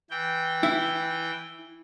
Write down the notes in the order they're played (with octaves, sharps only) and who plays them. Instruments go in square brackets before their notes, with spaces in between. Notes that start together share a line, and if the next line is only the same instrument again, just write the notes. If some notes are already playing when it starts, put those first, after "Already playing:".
[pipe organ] E3 G5
[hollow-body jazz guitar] E4